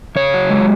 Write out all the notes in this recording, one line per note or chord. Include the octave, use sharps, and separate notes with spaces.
C#3 C#5
F#3
G#3